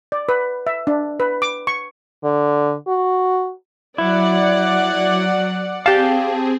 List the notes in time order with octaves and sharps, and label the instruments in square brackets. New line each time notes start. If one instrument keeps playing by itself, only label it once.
[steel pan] D5
B4
E5
D4
B4
D6
C#6
[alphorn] D3
F#4
[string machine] F#3 [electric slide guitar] E4 [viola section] D5 F#5
[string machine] C4 G#4 [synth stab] G4 A5 [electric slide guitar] F5 G5